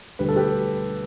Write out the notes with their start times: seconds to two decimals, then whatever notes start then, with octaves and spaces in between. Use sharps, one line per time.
0.19 E1 D2 D3 G3 B4
0.29 A4
0.36 G4 B4